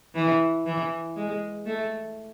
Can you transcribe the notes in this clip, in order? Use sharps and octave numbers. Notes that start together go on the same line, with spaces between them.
E3
E3
G#3
A3